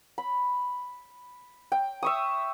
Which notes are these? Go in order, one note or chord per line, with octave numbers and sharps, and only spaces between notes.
B5
G5
E5 C#6 D#6